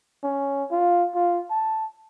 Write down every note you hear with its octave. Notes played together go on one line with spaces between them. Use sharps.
C#4
F4
F4
A5